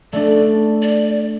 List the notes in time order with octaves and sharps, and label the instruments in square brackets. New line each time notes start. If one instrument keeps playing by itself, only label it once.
[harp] A3 D4 [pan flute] D5
[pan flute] D5